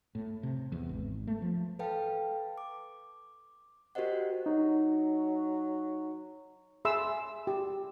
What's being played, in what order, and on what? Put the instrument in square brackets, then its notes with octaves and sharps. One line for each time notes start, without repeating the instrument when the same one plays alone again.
[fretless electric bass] A2
C3
E2
G#1
A3
F3
[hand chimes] A4 B4 F5 G5 A5
D6
F#4 G4 A#4 C5 D#5 F#5
[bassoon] F#3 [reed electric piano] D#4
[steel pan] G#4 E5 B5 C6 E6
G4